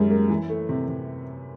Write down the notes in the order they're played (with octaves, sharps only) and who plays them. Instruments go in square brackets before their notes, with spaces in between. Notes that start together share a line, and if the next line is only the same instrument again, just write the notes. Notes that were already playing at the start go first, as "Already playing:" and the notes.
Already playing: [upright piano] F#2 D#3 G3 [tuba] G#3
[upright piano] A#3
E3
A3
C3
C3